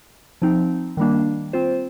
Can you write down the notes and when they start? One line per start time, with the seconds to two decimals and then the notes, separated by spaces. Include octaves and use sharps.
0.42 F3 C4 D#4
0.97 D#3 G3 A#3 D4
1.53 C4 F4 C5